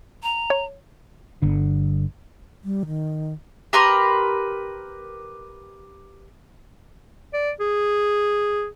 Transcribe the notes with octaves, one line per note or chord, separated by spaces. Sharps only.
A#5
C#5
G1 D3
G3
D#3
G4 A#4 B4 C6
D5
G#4